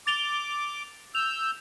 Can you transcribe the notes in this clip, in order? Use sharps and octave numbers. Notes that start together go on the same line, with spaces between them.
D6 A6 F7 G7
E6 G6 F7